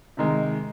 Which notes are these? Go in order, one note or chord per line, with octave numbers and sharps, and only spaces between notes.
C3 D#3 G#3